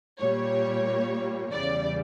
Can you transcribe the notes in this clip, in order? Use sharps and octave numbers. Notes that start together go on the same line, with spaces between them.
A#2 G3 A#3 C#5
E2 C#3 E3 G3 D5